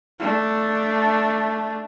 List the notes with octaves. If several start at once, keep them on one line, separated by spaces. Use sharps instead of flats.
A3 D4